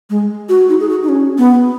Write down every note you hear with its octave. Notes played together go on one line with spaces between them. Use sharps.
G#3
F#4
D#4
G#4
F#4
D#4
C#4
B3